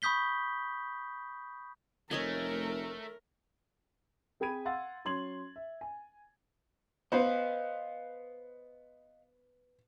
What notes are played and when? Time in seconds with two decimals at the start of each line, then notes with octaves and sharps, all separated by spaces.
0.02 B5 C#6 D#6 G6 B6 G7
2.11 F1 A3 A#4 C#5 D#5 G#5
4.40 C4 G#4 G5 B5 G#6 D#7
4.65 F5 F#5 C6 E6 A6
5.05 F#3 C#4 C6 G#6 F#7
5.56 E5
5.81 G#5
7.12 B3 B4 C5 D#5 F5